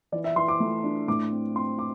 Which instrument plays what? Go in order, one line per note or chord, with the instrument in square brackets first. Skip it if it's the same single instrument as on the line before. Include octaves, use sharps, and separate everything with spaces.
[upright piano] E3 D5
E5
E3 C6
D6
A3
D4
A2 D6
C4
C4 C6
D6